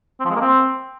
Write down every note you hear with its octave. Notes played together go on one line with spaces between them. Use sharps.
C4
F3
G#3
A#3
C4